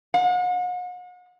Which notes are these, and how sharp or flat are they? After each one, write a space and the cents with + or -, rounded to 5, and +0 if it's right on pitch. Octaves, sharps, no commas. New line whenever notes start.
F#5 -40